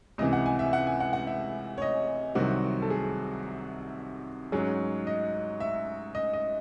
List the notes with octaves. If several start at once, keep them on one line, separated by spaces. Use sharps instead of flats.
C#2 C3 E3 D#5
F#5
G#5
E5
F#5
G#5
F#5
F#5
E5
C#5
D#5
C2 C3 D#3 F#3 C4 F#4
A4
G#4
G#2 F#3 C#4 G#4
D#5
E5
D#5
D#5